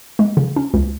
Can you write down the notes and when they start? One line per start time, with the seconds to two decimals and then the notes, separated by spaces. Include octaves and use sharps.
0.19 G#3
0.37 C#3
0.56 C#4
0.74 C#2